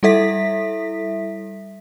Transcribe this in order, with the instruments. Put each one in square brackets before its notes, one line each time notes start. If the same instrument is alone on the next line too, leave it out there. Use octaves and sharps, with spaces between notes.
[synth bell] G3 E4 A4 E5 B6